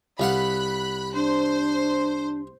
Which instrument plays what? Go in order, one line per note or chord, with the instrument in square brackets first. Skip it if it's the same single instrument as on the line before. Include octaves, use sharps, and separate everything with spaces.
[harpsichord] C2 F5 F#5 [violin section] B5 F#6
[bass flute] D4 [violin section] C5